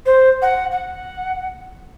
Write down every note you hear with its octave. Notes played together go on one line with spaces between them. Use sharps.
C5
F#5
F#5